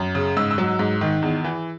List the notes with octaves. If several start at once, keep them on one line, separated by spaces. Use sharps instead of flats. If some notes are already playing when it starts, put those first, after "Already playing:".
Already playing: F#2
C#3
G#2 E6
E6
F#3
G#2
D#3
E2
E3